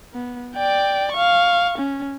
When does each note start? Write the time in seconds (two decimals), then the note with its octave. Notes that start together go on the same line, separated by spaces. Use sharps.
0.14 B3
0.56 D5 G5
1.13 F5 C#6
1.78 C#4